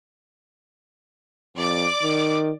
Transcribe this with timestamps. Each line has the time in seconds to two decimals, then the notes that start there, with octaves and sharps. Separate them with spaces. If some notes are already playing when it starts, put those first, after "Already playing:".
1.57 F2 D5 D6
2.03 D#3